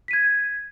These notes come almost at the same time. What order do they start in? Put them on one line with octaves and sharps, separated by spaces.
B6 D#7 G#6